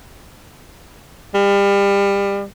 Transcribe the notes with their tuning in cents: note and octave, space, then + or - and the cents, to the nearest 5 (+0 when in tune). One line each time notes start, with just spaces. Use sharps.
G3 +30